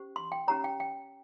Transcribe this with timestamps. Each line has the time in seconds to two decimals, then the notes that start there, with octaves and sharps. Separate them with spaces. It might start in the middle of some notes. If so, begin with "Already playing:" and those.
Already playing: C#4 G4 C5
0.16 C6
0.32 G5
0.48 C#4 G4 C#5 A#5
0.64 G5
0.80 G5